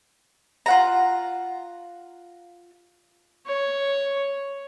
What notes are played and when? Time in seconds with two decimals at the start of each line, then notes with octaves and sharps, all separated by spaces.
0.66 F4 F#5 A#5
3.46 C#5